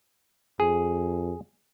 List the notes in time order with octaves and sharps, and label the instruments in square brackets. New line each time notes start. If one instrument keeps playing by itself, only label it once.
[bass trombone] F2 [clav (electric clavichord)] G#4